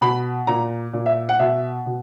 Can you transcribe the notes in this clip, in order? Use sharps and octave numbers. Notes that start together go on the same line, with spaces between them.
B2 B5
A#2 A#5
A#2
E5
F#5
B2 E5
B2